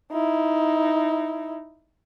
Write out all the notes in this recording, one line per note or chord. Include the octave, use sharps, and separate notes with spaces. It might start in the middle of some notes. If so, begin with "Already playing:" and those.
D#4 E4